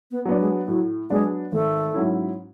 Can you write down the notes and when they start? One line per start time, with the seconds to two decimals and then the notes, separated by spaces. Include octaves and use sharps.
0.11 B3
0.25 F#3 B3 D4
0.39 G#3
0.68 A2 F#3
1.10 F#3 G#3 B3 D4
1.52 G#1 A3
1.94 G#2 F#3 C#4 E4